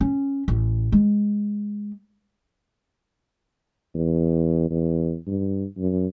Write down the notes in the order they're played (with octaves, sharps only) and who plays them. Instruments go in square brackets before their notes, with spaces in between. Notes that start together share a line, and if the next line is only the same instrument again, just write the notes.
[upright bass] C#4
A1
G#3
[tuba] E2
E2
G2
F#2